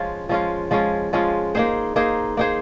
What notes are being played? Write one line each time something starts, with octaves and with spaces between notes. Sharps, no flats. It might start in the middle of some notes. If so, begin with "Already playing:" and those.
Already playing: F3 G#3 C#4 F4
F3 G#3 C#4 F4
F3 G#3 C#4 F4
F3 G#3 C#4 F4
A#3 D#4 G#4 C5
A#3 D#4 G#4 C5
A#3 D#4 G#4 C5